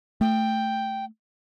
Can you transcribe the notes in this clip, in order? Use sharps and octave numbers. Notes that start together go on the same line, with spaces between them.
A3 G5